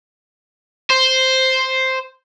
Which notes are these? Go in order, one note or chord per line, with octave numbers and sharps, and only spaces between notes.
C5